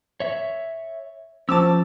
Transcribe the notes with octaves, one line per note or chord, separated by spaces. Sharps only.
C#5 E5
F3 C#4 C5 A5 D6 E6